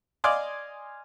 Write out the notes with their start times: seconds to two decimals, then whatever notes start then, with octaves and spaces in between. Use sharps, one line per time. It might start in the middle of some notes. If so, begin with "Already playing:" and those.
0.24 D5 D#5 F5 G#5 C6 D6